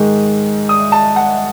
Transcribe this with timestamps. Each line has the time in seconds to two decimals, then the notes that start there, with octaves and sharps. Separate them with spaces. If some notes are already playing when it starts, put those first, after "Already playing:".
Already playing: G#2 D#3 G#3
0.69 D#6
0.92 A5
1.16 F#5